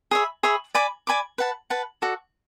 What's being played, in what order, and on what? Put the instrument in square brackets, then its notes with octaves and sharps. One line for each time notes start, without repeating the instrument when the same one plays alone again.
[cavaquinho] G#4 C#5 E5 B5
G#4 C#5 E5 B5
D5 G#5 B5 D6
D5 G#5 B5 D6
B4 F#5 A5
B4 F#5 A5
F#4 A4 D5